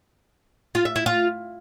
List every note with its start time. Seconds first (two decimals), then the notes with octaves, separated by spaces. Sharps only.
0.75 F4
0.85 E5
0.96 E4
1.06 F4